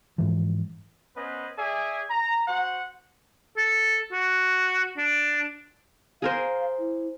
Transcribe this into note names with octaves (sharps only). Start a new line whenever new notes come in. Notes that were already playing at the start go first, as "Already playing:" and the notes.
G#2 E3 F3
B3 C#4 B4 C5 D#5
G#4 D5 E5 G#5
A#5
F#4 C5 F#5
A4
F#4
D4
G#4 A#4 C5 F5
E4